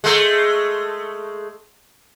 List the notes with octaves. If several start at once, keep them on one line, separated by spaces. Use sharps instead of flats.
G#3 A3